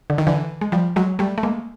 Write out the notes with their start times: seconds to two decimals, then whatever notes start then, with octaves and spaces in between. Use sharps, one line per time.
0.10 D3
0.18 D#3
0.27 D3 E3
0.61 G#3
0.72 F3 G3
0.96 F#3 G#3
1.19 G3 A3
1.38 A3
1.43 G#3 A#3